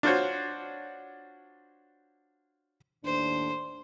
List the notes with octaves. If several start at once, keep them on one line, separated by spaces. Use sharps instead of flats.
D4 F4 F#4 C5 C#5
D#2 A2 D4 C5